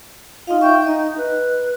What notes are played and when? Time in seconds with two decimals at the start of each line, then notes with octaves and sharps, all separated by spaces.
0.47 D#4 F4 D#5 F5
0.61 E5 G5 C#6
0.87 D#4 D#5
1.18 B4